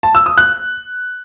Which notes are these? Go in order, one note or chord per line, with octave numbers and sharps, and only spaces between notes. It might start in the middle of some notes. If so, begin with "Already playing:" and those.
A5
E6
D#6
F#6